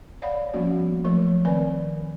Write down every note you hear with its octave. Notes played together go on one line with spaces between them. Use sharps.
C#5 D5 F5 F#5 B5
F3 G3 A#3 B3 C#4 F#4
F3 F#3 A3 A#4 C#5
D#3 C4 A#4 B4 D5 G#5